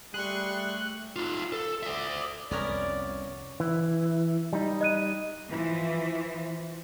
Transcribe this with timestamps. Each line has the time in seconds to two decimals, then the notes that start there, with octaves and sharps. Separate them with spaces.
0.14 G3 A3 G#4 C6 C#6 F#6
1.16 D#4 F4
1.52 A4
1.83 D5 E5
2.51 C2 F2 B3 C#4 A#4 D5
3.60 E3
4.53 G3 D#4
4.81 D#5 F#6 D#7
5.50 E3 F3